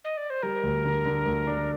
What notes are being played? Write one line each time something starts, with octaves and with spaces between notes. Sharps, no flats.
D#5
D5
C5
G3 A#4
D2
D3
D3
D2
D4